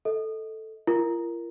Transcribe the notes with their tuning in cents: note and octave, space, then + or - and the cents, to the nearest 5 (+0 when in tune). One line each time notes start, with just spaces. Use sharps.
A4 +0 D#5 +20
F4 -45 A#4 +0